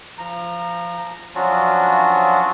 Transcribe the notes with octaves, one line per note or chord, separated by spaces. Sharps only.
F3 A#5
F3 F#3 C#4 D4 F4 F#4